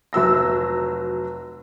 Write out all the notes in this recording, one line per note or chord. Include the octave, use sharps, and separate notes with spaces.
F1 F#3 E6 A#6